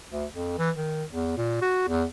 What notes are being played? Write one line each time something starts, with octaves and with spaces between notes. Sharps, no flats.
D2
F2
E3
D#3
E2
A#2
F#4
E2